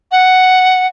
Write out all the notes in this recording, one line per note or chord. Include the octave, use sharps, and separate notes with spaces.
F#5